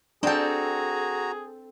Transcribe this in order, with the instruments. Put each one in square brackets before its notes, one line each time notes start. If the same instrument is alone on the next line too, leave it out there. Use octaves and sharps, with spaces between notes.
[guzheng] C4 A4 [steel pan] D4 G5 [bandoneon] F#4 A#5 [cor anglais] G#4